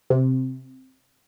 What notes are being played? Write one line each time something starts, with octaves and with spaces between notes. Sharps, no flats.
C3